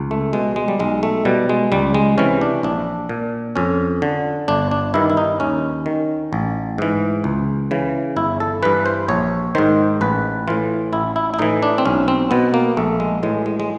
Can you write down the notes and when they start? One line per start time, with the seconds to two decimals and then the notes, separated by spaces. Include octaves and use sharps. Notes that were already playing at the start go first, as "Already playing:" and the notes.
Already playing: C#2
0.11 A3
0.33 B2 G#3
0.56 G#3
0.68 G3
0.80 B1 G#3
1.03 A3
1.25 B2 G3
1.49 G#3
1.72 C#2 G3
1.94 G#3
2.18 C3 E3 C#4
2.41 D4
2.63 A#1 D4
3.09 A#2
3.56 F2 C#4
4.02 D3
4.48 G1 D4
4.71 D4
4.94 G2 D#3 E4
5.10 E4
5.17 D#4
5.40 D#2 C#4
5.86 D#3
6.33 A1
6.78 G#2 E3
7.24 C#2
7.71 C#3 E3
8.16 G1 E4
8.40 A4
8.63 G2 E3 B4
8.86 C5
9.08 A#1 C#5
9.55 G#2 D#3 C5
10.01 A1 B4
10.47 A2 E3 F4
10.93 A1 E4
11.16 E4
11.34 E4
11.39 A2 E3 D#4
11.63 D4
11.78 C4
11.85 B1 C#4
12.08 C4
12.31 B2 B3
12.54 A#3
12.77 A#1 A3
13.00 G#3
13.23 A2 E3 G#3
13.46 G#3
13.60 G#3